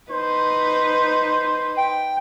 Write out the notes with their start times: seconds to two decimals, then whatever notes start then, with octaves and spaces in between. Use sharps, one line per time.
0.11 D#4 B4 C5
1.77 G5